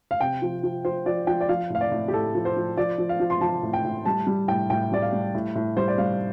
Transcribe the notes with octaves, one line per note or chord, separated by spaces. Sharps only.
F5
C3 G5
F3
F3
F3 C5
F3 D5
F3 G5
D5
F3 F5
A2 F5
D5
A2
G4
A2 A4
F3
C5
F3
F3 D5
F3
F5
F3
C6
F3 A5
A2
G5
A2
G3 A5
G3
A2 G5
A2 G5
G3 D5
F5
G3
A2
A2
G3 C5
D5
G3 F5